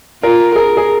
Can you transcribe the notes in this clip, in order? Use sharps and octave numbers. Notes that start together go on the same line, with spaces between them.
F4 A#4
G#4 A#4
G#4